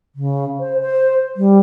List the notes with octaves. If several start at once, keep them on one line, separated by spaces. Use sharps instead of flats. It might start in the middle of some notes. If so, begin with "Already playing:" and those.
C#3
C5
C5
G3